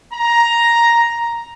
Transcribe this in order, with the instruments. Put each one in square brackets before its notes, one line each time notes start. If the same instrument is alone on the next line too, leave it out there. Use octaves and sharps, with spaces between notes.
[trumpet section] A#5